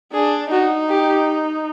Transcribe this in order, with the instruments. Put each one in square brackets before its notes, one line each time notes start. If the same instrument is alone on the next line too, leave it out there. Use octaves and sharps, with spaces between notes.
[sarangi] D4 [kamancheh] G#4
[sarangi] D#4 [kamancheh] F#4
[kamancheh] G4